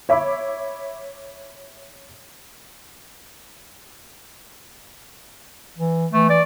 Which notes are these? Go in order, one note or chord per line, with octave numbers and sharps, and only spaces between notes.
C#5 E5 B5 D6
E3
E3 A3
D5